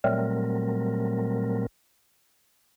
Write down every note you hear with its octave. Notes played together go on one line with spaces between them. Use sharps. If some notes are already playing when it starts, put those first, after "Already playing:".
A#2 F#3 G3 A3 C4 A#4